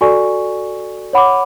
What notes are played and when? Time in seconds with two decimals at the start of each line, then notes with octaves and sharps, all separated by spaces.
0.01 F#4 A4 D5 G#5 C#6
1.13 C#5 F#5 B5 D6